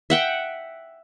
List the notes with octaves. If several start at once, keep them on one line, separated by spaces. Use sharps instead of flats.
E5 F#5 G5